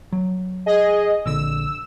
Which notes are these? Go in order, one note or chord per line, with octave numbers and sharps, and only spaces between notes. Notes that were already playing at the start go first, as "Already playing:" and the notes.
F#3
G#4 D#5
A#1 D3 E6